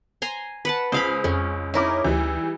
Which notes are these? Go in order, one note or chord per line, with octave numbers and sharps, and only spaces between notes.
G#5 A#5 C6
B4 F#5 A5
C#2 C5 F5 B5 D#6
F2 G#3 C#4
C#4 D#4 E4 A#4 D6
D2 E3 G3